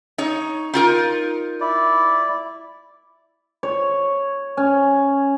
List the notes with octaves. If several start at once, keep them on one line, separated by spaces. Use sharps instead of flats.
D#4 C#5
D#4 F4 A#4
E4 D5
C#5
C#4